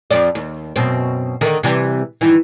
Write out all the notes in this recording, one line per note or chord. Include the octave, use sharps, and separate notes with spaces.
F2 F3 D5
D#2
F#2 B2 C4
D3 D#3 A#4
C3 E3 G3
G2 D#3 E3